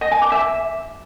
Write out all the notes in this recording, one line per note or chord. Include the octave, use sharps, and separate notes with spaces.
D#5
G#5
D6
E5